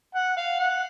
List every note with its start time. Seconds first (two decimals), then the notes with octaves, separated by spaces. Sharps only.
0.15 F#5
0.37 F5
0.60 F#5